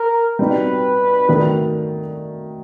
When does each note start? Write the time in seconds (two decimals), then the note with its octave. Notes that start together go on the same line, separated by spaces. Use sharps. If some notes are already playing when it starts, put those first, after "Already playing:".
Already playing: A#4
0.39 G3 C4 D#4 F#4 B4
1.29 D#3 F#3 A3 D4